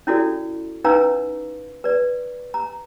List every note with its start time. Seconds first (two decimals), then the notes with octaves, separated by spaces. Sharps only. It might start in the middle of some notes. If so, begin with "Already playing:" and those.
0.07 C#4 E4 F#4 A4 D5
0.84 C#4 D#4 B4 F5 A#5 E6
1.84 B4 D5
2.54 A#5